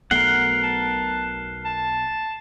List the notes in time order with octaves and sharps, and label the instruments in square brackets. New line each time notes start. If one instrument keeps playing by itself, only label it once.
[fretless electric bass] B1 B2 A3 [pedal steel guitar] A#4 F#5 [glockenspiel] C7 G7
[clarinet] A5
A5